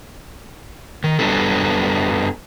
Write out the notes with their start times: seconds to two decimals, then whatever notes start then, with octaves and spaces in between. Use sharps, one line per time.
1.04 D#3
1.19 F#2 F#3 G3 B3 D4 A4